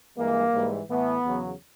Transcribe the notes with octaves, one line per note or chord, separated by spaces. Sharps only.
G2 E3 G#3 A#3
G#2 E3 G3
A2 E3 A3 B3
E2 C#3 F#3